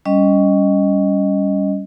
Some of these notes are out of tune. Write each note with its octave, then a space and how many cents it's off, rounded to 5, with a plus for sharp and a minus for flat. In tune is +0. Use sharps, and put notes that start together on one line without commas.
G3 +0 C#4 +15 D#5 +0